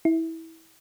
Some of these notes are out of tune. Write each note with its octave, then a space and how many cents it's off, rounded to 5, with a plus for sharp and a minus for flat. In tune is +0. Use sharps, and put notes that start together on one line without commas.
E4 -20